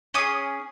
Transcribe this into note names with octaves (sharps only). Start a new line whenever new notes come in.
C#4 G#4 D#6